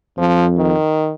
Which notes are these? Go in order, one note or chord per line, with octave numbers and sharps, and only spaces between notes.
F2 F3
D#3